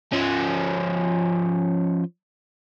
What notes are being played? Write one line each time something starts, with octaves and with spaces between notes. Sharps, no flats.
F3 C#4